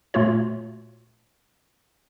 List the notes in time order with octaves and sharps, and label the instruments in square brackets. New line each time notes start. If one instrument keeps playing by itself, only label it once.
[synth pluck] A#2 A3 F4 F#4 C#5